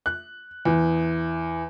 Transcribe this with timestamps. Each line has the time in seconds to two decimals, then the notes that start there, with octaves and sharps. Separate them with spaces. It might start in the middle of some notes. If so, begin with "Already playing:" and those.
0.06 F#6
0.65 E2